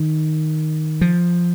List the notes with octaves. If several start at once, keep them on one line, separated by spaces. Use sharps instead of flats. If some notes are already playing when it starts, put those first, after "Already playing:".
Already playing: D#3
F3